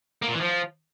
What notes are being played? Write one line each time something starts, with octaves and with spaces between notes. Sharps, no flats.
A#3
A#2
E3
F3